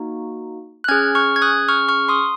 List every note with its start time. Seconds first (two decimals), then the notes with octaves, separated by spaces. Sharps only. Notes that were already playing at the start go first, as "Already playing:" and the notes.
Already playing: A#3 D#4 F#4
0.84 F#6
0.88 C#4 G#4 F6 G#6
1.15 C#6 F6
1.36 G#6
1.42 D#6 F#6
1.69 C#6 F6
1.89 C#6 F6
2.09 C6 D#6